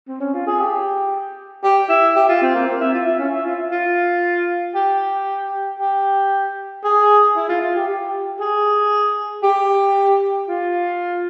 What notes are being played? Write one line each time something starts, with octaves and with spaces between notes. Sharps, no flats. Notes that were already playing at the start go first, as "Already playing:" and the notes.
C4
C#4
F4
G#4
G4
G4
E4
G4
F4
C4
A#3
C4
E4
F4
E4
C#4
E4
F4
F4
G4
G4
G#4
E4
F4
F4
G4
G4
G#4
G4
F4